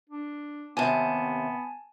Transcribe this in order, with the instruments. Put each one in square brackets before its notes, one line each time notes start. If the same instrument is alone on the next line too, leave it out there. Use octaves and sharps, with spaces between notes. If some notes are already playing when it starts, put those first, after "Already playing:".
[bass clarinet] D4
[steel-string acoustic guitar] D#2 C3 [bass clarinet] B3 [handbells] G#5 A5